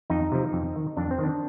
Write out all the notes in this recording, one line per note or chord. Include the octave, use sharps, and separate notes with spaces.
F2 D#4
C3 F3
F2
D#3
F2 D4
C4
D#3 D4